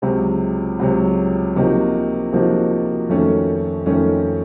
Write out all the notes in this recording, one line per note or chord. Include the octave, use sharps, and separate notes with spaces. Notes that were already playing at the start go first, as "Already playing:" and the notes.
C#2 C3 F#3
C#2 C3 F#3
C3 F3 A#3 D#4 F#4
C3 F3 A#3 D#4 F#4
F2 D#3 A3 C#4
F2 D#3 A3 C#4